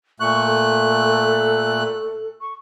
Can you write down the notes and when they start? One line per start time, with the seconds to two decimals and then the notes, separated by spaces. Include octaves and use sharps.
0.20 A#2 A3 C#6 F#6
0.46 A4
2.41 C#6